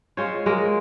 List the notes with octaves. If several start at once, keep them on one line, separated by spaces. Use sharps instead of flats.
G#3 F4 C5 C#5
G#3 A#3 A#4